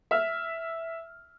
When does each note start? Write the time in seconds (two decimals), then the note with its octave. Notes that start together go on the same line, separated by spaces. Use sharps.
0.11 E5 F6